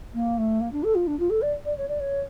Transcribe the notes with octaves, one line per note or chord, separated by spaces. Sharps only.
A#3
A3
A#3
D4
A4
F4
D4
F4
A4
D5
D5
C#5
D5
C#5